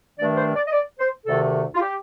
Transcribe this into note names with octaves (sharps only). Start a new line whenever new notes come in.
G2 D#3 A3 D4 D5
C5
D5
D#5
D5
C5
D2 C3 D#3 A3 A4
F4
G4